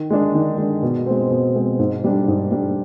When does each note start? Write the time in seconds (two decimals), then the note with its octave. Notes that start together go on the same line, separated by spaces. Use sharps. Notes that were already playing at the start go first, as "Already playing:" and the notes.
Already playing: D#3
0.10 G#3 D4
0.34 D#3
0.58 G#3 D4
0.82 B2
1.06 G#3 C4
1.30 B2
1.55 G#3 C4
1.79 G#2
2.04 G3 D4
2.28 G#2
2.51 G3 D4